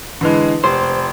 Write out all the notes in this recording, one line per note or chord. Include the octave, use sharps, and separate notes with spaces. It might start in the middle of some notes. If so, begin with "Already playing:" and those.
D3 E3 G#3
F1 C5